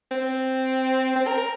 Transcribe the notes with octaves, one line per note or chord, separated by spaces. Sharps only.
C4
C4
A#4
A#4